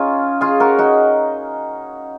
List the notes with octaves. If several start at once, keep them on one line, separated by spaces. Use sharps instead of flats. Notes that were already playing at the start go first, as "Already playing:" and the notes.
Already playing: C#4 D#4 F4 G#4
F4 G#4
F#4 A#4
D#4 F#4